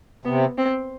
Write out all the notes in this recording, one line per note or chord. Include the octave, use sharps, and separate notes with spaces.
C3 B3
C4